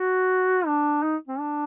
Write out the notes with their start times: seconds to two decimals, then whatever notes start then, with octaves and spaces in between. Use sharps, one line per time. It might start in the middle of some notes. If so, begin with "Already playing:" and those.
Already playing: F#4
0.66 D4
1.03 D#4
1.28 C4
1.40 D4